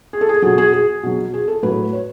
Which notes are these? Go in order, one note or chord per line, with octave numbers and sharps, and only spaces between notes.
G#4
A4
G#4
B2 F#3 G#4
G#4
G#4
B2 F#3
G#4
A4
A2 F#3 B4
C#5